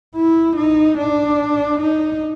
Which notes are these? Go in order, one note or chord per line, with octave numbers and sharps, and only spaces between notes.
E4
D#4
D4
D#4